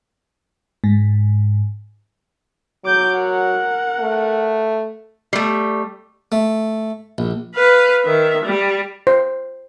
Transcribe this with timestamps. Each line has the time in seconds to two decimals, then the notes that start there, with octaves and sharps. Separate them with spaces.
0.84 G#2
2.85 F#3 D6 G6
3.17 A#4 F#5
4.00 A3
5.33 G3 A3
6.32 A3
7.18 A#1
7.55 B4 F5
8.04 D#3 E5
8.45 G3
9.07 C5